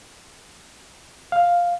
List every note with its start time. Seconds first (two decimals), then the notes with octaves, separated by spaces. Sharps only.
1.32 F5